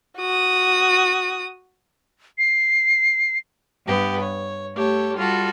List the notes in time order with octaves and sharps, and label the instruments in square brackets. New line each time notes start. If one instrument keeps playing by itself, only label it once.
[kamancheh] F#4 D#6
[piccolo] C7
[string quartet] G2 B3 G4
C#5
A3 G4 A4 C#5
G3 F4 F#4 A4